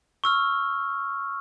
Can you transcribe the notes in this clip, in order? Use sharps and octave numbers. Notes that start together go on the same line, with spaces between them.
C#6 E6 F6